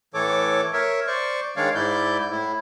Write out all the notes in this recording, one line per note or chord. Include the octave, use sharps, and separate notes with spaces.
A2 E3 A4 C#5 D6
A#4 C#5 E5
C5 D5 C#6
D#3 G#3 D4 C#5 D5 F5
G#2 E4 D5 G6
A2 E4